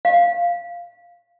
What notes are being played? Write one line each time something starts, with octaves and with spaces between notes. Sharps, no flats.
F5